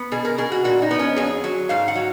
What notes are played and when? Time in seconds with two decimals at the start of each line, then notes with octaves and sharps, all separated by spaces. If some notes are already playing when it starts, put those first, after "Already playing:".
Already playing: B3
0.12 B2 G#4
0.25 A#4
0.38 B2 G#4
0.52 F#4
0.64 A#2 F#4
0.82 D#4
0.91 B3
0.99 C#4
1.16 F2 G#4
1.44 F#3
1.69 G#2 F5
1.88 F#5
1.95 F#3